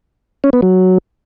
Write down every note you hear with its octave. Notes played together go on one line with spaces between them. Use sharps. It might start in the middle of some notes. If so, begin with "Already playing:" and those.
C#4
B3
F#3